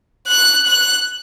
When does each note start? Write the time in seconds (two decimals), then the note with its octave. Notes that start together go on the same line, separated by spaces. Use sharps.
0.27 F#6
0.67 F#6